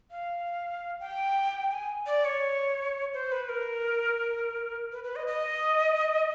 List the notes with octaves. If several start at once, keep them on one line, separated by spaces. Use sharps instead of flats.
F5
G5
G#5
D5
C#5
C5
B4
A#4
B4
B4
D#5
D#5